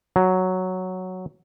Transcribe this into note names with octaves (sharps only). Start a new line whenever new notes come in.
F#3